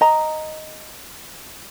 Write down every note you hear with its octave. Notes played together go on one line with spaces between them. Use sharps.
D#5 A#5